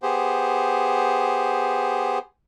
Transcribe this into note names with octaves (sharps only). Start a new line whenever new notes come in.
B3 G4 G#4 C5